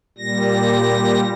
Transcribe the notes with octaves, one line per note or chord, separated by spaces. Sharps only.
A#2 G3 A#6